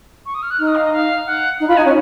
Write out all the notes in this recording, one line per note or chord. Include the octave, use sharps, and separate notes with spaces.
C#6
D#6
F6
F#6
D#4 F6
D#6
F5
D#5
F5
F#5
D#4
F4 B5
D#4 G#5
C#4 F#5